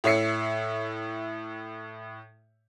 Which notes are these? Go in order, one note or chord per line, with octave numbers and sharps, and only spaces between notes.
A2 C#5 E5 C7 C#7